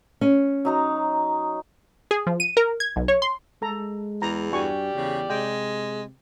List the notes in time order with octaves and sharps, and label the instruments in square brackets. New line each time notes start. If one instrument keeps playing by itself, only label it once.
[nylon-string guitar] C#4
[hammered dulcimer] F#3 D#4 A#5
[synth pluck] G#4
F3
D#7
A#4
G#6
B1
C#5
C6
[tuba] G#3 [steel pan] A4 A#5
[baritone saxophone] E2 [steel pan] A#5
[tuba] G2 [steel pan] F#4 G#5 C#6 [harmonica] G4 D5
[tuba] E2 [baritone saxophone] C#3
[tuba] C3 [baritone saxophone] G#3 [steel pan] G5